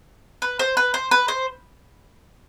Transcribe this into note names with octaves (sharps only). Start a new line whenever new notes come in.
B4
C5
B4
C5
B4
C5